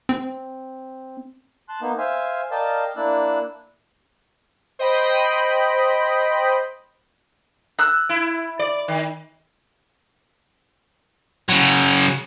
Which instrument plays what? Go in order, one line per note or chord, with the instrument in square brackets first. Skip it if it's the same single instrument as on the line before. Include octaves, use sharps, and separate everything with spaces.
[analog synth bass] C4
[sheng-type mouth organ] A5 C6 F#6
A#3 B3 D#4
C5 E5 F5 G#5
A#4 D5 D#5 F5 G5 A5
A#3 D4 E4 D5 E6 F#6
[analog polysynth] C5 D#5 G5 B5
[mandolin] E6 F#6
[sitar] E4
D5
D#3
[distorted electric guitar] C#3 F#3